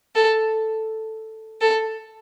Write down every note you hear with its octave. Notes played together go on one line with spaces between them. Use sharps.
A4
A4